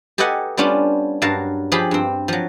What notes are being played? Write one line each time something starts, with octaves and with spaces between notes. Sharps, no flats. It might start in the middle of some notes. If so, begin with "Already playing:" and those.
G4 A4 B4 D#5 F#5 G#5
G3 B3 C#4 D4 F4 G4
G2 F#3 A#4 F5 A5
F3 G4 G#4 B5
G2 C4
F3 F#3